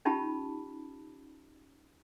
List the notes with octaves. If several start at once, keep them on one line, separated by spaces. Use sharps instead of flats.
C#4 D#4 F4 G4 A5 B5